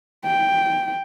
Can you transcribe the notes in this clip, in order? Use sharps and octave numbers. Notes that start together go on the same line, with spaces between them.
G5